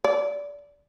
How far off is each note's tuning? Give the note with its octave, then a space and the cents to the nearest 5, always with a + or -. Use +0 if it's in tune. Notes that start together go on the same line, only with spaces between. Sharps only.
D5 -20